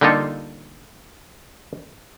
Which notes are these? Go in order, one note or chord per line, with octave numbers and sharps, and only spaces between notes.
D3 G3 A#3 D#4 F4 A4